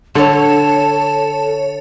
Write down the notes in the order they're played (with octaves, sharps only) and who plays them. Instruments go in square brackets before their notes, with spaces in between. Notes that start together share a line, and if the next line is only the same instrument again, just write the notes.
[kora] D3 [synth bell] A4 C#5 [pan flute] A5